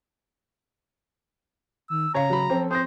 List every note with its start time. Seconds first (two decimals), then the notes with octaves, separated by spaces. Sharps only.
1.90 D#3 E6
2.14 C#3 C#4 C#5 F5 A#5 C#6
2.30 F#3 B5
2.50 F3 C4 A4
2.71 C4 C5 D#6 A#6